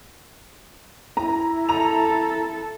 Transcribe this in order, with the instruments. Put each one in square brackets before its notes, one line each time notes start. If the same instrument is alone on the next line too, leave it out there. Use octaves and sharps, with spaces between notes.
[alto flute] E4 [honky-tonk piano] A#5
[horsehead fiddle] A4 [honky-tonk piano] A#5 F7